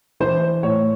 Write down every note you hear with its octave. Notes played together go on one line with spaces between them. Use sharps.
E3 C5
A2 C#5